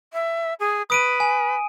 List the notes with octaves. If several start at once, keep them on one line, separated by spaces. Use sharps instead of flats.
E5
G#4
B4 D#6 D7 D#7
G#5